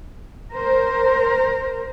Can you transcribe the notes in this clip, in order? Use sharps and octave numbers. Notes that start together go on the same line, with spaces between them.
A#4 C5